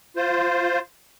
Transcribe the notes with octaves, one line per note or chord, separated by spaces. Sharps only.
F4 C5